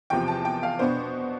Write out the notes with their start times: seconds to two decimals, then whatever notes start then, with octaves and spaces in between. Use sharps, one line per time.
0.10 E2 C3 F3 G5
0.28 A5
0.45 G5
0.63 F5
0.79 B2 B3 D4 C5